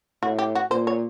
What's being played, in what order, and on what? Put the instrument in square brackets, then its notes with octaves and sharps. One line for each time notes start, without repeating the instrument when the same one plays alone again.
[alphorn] A2 [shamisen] F#4
[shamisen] G4
F#4
[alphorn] A#2 [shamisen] C5
[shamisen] C#5